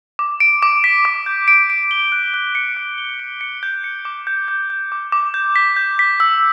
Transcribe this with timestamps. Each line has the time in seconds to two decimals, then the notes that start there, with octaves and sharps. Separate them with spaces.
0.19 D6
0.40 D7
0.63 D6
0.84 B6
1.05 D6
1.26 G6
1.48 D7
1.70 D7
1.91 G7
2.12 F#6
2.34 F#6
2.55 C#7
2.77 F#6
2.98 G7
3.20 C#7
3.41 C#7
3.63 G6
3.84 C#7
4.05 D6
4.27 G6
4.48 G6
4.70 G6
4.92 D6
5.12 D6
5.34 G6
5.56 B6
5.76 G6
5.99 B6
6.20 E6